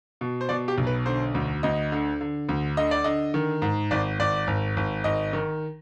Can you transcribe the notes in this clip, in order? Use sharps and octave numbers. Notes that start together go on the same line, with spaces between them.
B2
C5
B2 D5
G4
B1
B4
D3 C5
D2
D2 D#5
D3
D3
D2
D3 D#5
D5
D3 D#5
D#3
G#2
G#1 D5
G#1 D5
G#1
G#1
G#1 D#5
D#3